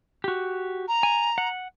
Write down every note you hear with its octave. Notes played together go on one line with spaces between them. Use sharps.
F#4 G4
A#5
G#5
F#5